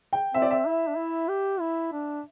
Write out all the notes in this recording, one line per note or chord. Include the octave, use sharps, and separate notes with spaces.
G5
C4 E5
D5
E5
E4
D4
E4
G4
E4
D4